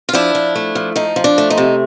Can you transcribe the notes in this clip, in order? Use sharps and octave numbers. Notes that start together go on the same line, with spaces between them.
F4
F3 D4 E4
F3
A3
F3
F3 D#4
F3
D4
A3
D#4
C3